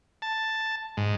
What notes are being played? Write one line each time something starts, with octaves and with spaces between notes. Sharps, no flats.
A5
G#2